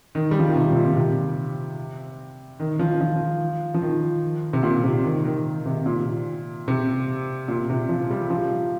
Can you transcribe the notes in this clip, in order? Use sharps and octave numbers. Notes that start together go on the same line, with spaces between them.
D#3
G3
F3
D#3
C3
C3
A#2
C3
D#3
F3
F3
F3
D#3
C3
A#2
C3
D#3
D#3
C3
A#2
C3
A#2
C3
F3
G3
F3